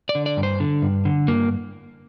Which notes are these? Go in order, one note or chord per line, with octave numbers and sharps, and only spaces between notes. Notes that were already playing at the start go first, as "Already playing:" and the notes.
D5
D3
D5
G2
C5
D3
G2
D3
G2 A#3